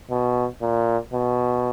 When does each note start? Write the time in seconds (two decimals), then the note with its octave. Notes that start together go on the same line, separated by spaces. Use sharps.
0.10 B2
0.61 A#2
1.13 B2